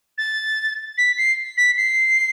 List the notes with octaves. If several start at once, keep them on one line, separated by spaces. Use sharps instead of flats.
A6
B6
C7
B6
C7